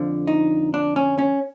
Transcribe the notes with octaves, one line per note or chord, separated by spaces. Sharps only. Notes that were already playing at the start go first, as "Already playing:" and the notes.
Already playing: F2 D3 F3
D#4
D4
C#4
C#4